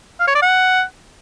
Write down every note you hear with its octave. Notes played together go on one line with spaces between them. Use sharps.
F5
C#5
D5
F#5